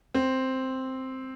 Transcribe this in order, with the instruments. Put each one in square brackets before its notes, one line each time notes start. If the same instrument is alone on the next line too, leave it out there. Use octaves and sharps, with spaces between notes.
[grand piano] C4